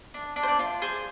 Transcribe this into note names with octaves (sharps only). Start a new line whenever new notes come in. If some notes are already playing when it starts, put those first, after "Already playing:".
D4
D4
C5
D5
F4
G#4 C5